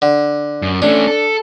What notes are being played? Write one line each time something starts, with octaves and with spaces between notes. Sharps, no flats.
D3
F#2
A3 C#4 D4
A4